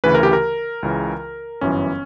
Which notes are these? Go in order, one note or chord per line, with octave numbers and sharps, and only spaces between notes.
D2 C#3 E3 B4
A#4
G4
A#4
C#2 C#3 E3
G1 F#2 E3 C#4